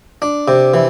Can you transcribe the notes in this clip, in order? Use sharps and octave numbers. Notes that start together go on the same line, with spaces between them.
D4
C3
E3